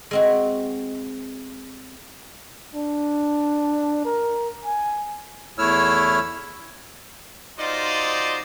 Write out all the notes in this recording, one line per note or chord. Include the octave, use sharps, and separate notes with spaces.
G#3 C4 F#4
D4
A#4
G#5
E2 A3 E4 C#5 E6 F6
D#4 F4 F#4 C5 D5 D#5